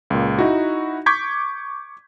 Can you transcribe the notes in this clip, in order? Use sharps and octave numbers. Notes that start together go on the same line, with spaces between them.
C#2 A#2
D#4 E4 F#4
C#6 D6 G6 G#6 B6